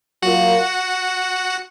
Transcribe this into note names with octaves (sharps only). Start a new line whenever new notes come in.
F#3 A#3 F4 F#4 A#4 F#5